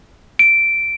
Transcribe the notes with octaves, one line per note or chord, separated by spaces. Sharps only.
D7